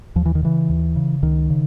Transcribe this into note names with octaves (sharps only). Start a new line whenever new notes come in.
D#2 F3
E3
D#3
C#3 E3
D#2
C#3
C#2 D#3
C#3